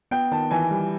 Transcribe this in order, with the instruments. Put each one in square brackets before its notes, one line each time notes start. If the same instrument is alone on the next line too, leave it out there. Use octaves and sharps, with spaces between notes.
[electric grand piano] B3 [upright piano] G5
[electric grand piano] D#3 [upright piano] A5
[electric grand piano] E3 [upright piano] G#5
[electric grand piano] G3